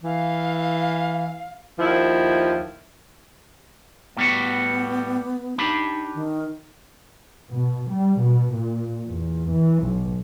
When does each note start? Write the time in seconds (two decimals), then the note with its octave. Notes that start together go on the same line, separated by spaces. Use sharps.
0.04 E3 F5
1.79 D#2 F3 E4
4.17 A2 G3 B3 F#4
5.58 D4 D#4 G4 B5
6.14 D#3
7.54 B2
7.91 G3
8.21 B2
8.56 A#2
9.08 E2
9.56 E3
9.86 B1